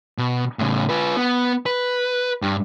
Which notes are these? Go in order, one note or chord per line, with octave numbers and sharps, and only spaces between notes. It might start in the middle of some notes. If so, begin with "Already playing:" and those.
B2
A2 C#3
F4 B4
B3
B4
G2